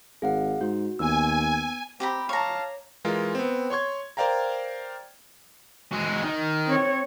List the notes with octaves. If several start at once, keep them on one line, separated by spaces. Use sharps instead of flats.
G#1 G#4 F5 F#5
G#2 F#4
D#2 B3 G#5 E6
C4 G4 A#5 B5
C#5 F5 A5 A#5
E3 G#3 F4 A#4
B3 C4
C#5 C6 C#6 G#6
A#4 C5 D5 F5 G5 A#5
G#3 F#4
D#3
C4 C#5